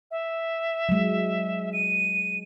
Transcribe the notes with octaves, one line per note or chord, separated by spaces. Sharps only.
E5
F#3 G#3
D#7